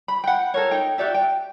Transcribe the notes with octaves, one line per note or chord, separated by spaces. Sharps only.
B5
F#5 G5
A4 A#4 C#5
D#4 G5
F#4 G4 D5 E5
G5